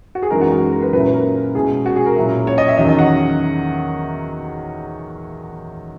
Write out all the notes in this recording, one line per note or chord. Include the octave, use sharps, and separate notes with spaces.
F#4
G#4
F#2 E3 G#3 D#4 A#4
F#4
F#4
A#4
B4
A#2 F#3 C#4 E4 B4
B4
A#4
B2 G#3 C#4 E4 G#4
F#4
G#4
A#4
A#2 F#3 C#4 E4
C#5
D#5
E5
E2 D#3 F#3 C#4 D#5
D#5
F#5